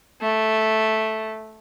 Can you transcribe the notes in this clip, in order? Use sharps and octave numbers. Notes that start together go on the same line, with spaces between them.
A3